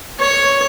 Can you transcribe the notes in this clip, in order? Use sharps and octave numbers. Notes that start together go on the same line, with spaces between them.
C#5